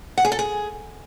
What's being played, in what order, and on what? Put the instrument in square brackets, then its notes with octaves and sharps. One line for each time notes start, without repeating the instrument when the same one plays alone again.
[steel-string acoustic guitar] F#5
G#4
A4
G#4